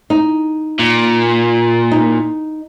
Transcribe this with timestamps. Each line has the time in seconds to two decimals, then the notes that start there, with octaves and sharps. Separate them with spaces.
0.10 D#4
0.79 A#2
1.92 D#4